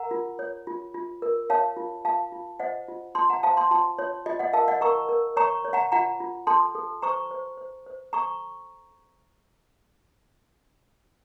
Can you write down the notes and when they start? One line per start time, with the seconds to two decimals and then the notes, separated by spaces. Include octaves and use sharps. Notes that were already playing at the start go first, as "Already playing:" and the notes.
Already playing: A#4 F#5 A#5
0.11 F4
0.39 C#5
0.67 F4
0.94 F4
1.22 A#4
1.50 C#5 F5 A5
1.77 F4
2.05 F4 F5 A5
2.32 F4
2.60 C5 D#5 F#5
2.88 F4
3.15 F4 A5 C6
3.29 F#5 A#5
3.43 C5 F5 A5
3.57 A5 C6
3.71 F4 A5 C6
3.99 F4 C#5
4.26 F4 D#5
4.39 D#5 F#5
4.53 A#4 F5 A5
4.68 D#5 F#5
4.81 A#4 A#5 C#6
5.09 A#4
5.37 C#5 A#5 C#6
5.65 C#5
5.73 F#5 A#5
5.92 F4 F#5 A#5
6.20 F4
6.47 A4 A5 C6
6.75 A4
7.02 C5 A#5 C#6
7.31 C5
7.58 C5
7.86 C5
8.13 A4 A#5 C#6